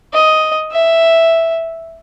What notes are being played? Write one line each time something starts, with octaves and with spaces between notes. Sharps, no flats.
D#5
E5